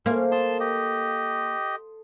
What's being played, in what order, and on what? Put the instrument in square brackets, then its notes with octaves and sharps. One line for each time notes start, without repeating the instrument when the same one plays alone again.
[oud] A#3 [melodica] C#4 [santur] A4 C5
[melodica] A5 C6 [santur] D#6
[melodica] G4 D#5